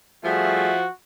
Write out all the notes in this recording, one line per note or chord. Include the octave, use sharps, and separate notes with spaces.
F3 G3 A3 F#4 G#4 E5